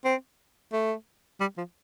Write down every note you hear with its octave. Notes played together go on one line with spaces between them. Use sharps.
C4
A3
G3
F3